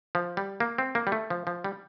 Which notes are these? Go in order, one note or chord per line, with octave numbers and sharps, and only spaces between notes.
F3
G3
A#3
C4
A#3
G3
A3
F3
F3
G3